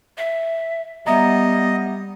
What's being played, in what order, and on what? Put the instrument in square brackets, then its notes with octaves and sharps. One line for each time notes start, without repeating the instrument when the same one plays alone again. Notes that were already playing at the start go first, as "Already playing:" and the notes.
[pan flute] E5
[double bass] G3 [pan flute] B3 [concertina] D#5 [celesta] E5 A#5